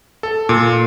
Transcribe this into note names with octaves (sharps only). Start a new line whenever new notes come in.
A4
A#2